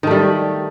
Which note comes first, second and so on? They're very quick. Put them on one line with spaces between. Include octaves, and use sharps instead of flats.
D#3 A3 G3